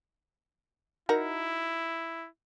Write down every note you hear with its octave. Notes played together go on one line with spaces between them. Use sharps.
D#4 E4 F#4 A#4